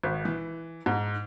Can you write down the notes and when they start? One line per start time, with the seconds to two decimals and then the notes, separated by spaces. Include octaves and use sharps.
0.03 G#1
0.25 E3
0.86 G#2